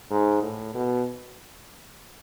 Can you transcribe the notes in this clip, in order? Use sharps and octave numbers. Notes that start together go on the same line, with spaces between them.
G#2
A2
B2